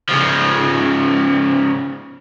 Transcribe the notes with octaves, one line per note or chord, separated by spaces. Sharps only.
C#3 F3